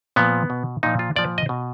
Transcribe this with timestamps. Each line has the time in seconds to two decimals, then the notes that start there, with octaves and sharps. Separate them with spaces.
0.16 A#2 F3 B3
0.50 B2
0.83 A#2 F3 D#4
0.99 F4
1.16 A#2 F3 D5
1.38 D#5
1.49 B2